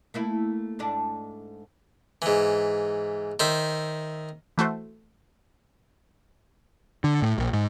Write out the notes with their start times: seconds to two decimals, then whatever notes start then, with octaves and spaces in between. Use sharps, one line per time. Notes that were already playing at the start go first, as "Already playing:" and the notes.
0.14 A3 A#3 E4
0.79 G#2 A3 D4
2.22 G#2 E3
3.40 D#3 C5 E5
4.58 E3 A3 F#4 C5
7.04 D3
7.22 A2
7.38 A#1
7.53 G#2